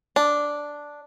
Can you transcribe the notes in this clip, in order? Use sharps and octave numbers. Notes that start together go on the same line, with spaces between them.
D4